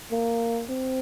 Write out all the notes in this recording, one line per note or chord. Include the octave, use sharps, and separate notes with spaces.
A#3
C4